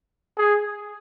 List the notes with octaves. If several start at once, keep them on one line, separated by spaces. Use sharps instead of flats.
G#4